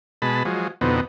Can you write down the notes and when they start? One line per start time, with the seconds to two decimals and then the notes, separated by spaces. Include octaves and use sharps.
0.22 B2 G#3 A5 B5
0.45 F3 F#3 G#3
0.81 F2 B2 D3 B3 C4 D#4